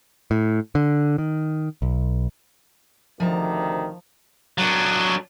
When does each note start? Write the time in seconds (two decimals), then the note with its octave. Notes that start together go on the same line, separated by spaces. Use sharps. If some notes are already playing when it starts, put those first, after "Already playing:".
0.31 A2
0.75 D3
1.18 D#3
1.82 B1
3.20 D2 C3 D#3 F3 A5 A#5
4.58 F#3 D4